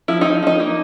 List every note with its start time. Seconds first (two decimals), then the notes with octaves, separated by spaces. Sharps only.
0.08 F3 E4
0.21 F3 D#4
0.43 F3 D#4
0.60 A#3